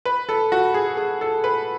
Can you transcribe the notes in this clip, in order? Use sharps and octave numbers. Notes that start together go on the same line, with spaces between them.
B4
A4
F#4
G#4
G#4
A4
B4